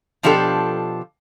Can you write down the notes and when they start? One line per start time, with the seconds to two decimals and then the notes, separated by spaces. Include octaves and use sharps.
0.23 B2 F3 D4 F4 G4 A4